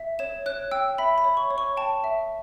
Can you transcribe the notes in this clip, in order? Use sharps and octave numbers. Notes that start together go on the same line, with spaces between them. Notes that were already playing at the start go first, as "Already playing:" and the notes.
Already playing: E5
C#5 E7
C#5 F#6
G5 E6
E5 B5
B5
C#5
C#6
C#5
C#6
G5 A5
E5